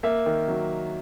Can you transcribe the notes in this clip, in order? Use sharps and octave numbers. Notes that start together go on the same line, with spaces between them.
A#3 E5
D#3
F#3